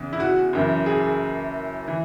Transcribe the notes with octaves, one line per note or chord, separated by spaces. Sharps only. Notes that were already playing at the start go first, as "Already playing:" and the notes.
Already playing: E2 C#3 E3
E4
F#4
F#1 F#2 E3
G#4
E3